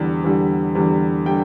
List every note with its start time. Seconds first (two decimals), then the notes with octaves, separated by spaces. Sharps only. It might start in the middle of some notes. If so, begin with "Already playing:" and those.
Already playing: E2 D3 G3
0.24 E2 D3 G3
0.75 E2 D3 G3
1.26 D3 G3 G5